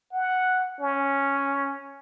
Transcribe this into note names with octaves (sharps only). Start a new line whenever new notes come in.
F#5
C#4